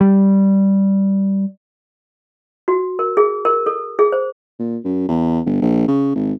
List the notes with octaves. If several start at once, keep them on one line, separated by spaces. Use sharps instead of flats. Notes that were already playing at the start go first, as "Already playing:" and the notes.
G3
F#4
A#4
G#4
A#4
A4
G#4
C5
A#2
F#2
E2
G1
A#1
C#3
G#1